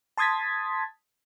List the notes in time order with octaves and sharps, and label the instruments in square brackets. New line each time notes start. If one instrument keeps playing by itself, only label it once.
[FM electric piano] A5 C6 D#6 G#6 A6 B6